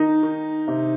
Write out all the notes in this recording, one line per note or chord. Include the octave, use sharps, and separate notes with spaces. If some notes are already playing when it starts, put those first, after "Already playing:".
Already playing: D#3 D#4
D#3
C3